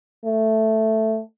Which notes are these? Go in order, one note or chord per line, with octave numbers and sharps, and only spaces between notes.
A3